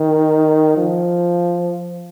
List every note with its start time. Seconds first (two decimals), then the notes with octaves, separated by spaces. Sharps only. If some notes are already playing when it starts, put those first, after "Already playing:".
Already playing: D#3
0.77 F3